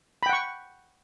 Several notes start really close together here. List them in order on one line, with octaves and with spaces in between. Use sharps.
B5 G5 F#5 C#6